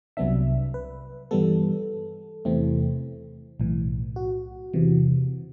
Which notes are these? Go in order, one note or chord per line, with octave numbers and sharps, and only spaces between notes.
C2 C3 F#3 B3 D4 E5
B4
G2 E3 G3 B3 A4
E2 C3 E3 A3 C4
B1 A2 E3
F#4
E2 C3 E3